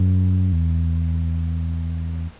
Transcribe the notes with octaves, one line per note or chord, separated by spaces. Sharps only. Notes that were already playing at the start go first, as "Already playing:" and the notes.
Already playing: F#2
E2